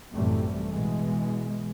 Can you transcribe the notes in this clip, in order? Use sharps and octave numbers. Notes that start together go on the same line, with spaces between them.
A1 F#2 C3 E3 G3 A3
B2 E3 G#3